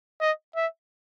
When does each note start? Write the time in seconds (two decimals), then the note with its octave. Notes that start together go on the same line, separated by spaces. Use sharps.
0.21 D#5
0.56 E5